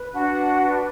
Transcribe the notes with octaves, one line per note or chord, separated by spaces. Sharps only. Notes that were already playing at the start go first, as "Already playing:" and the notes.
Already playing: B4
D4 F#4 F#5
B4